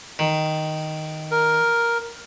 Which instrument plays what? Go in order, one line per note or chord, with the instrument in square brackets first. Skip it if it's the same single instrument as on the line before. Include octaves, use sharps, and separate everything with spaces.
[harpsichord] D#3
[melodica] A#4